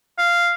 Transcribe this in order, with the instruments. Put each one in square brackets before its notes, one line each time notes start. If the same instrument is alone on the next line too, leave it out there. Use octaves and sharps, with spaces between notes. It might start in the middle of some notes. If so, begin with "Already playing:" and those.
[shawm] F5